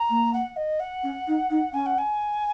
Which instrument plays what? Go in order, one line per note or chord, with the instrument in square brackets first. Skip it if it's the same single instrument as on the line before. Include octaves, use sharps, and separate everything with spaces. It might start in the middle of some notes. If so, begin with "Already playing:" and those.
Already playing: [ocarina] A#5
[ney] A#3
[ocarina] F#5
D#5
F#5
[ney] C#4
D#4
D#4
[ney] C#4 [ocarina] G#5
[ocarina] F#5
G#5